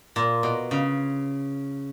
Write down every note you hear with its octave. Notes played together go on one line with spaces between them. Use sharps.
A#2
B2
C#3